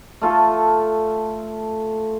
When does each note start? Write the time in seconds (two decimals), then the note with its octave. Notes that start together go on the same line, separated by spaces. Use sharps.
0.22 A3 F4 A4